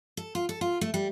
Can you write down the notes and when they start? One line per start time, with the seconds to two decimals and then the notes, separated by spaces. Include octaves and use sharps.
0.17 A4
0.35 F4
0.49 A4
0.61 F4
0.81 A3
0.94 G3